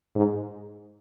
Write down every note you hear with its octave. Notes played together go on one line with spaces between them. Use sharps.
G#2